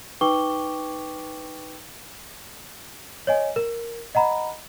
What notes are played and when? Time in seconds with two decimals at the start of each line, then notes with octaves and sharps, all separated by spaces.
0.21 D#4 B4 G5 C#6 D6 G7
3.27 C#5 D#5 G#5
3.56 A#4
4.15 D#5 F#5 A#5 B5